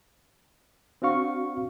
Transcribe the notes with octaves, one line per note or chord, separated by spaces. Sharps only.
C4 D4 F#4 F5 C#6